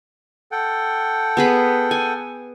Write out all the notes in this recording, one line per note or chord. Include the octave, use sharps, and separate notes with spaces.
A4 F#5 G5
B3 G#4 B5
G#5